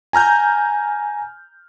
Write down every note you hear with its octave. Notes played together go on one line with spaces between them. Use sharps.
G#5 A#5 F6 G6